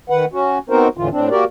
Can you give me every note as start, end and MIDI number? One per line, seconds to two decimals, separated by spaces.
0.10 0.25 51
0.10 0.25 71
0.10 0.25 78
0.33 0.58 61
0.33 0.58 66
0.70 0.88 59
0.70 0.88 60
0.70 0.88 63
0.70 0.88 66
0.70 0.88 70
0.70 0.88 72
0.97 1.09 40
0.97 1.09 45
0.97 1.09 50
0.97 1.09 52
0.97 1.09 65
1.11 1.29 45
1.11 1.29 60
1.11 1.29 62
1.30 1.45 58
1.30 1.45 66
1.30 1.45 67
1.30 1.45 70
1.30 1.45 74